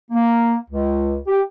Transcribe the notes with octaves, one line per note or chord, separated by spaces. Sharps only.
A#3
C#2
G4